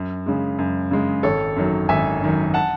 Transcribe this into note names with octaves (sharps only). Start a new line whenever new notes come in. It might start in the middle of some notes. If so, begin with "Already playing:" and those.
Already playing: F#2
C#3 G#3
F#2
C#3 G#3
G#1 A4 C#5
F#2 D#3 F#3
G#1 E5 G#5
F#2 D#3 F#3
F#5 A5